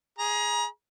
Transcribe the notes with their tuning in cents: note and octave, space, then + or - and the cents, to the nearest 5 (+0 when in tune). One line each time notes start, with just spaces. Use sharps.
G#4 +0 A#5 +35